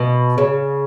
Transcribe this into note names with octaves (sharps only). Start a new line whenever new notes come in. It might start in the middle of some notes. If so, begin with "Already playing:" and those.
Already playing: B2
C#3